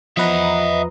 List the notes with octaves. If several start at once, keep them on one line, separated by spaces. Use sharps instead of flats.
E2 F3 B4 D#5 E5 F#5 A#5